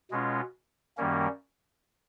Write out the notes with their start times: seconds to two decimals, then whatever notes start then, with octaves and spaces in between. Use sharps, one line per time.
0.11 B2 G#3 C#4 F4
0.98 F#2 D#3 G3 A#3 C#4